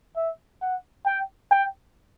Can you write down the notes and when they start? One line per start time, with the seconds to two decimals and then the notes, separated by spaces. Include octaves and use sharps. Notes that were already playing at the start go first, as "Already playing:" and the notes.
0.17 E5
0.62 F#5
1.06 G5
1.51 G5